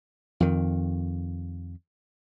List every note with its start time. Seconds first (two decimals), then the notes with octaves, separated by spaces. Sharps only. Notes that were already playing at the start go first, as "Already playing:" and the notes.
0.40 F2 D#3